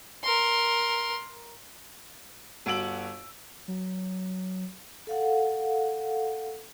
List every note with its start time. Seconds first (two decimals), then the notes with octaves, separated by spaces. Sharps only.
0.24 A#4 C6
2.66 G1 F#4 E6 D7 F#7
3.68 F#3
5.07 A4 F5 F#5